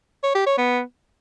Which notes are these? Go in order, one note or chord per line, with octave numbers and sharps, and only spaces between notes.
C#5
G4
C#5
B3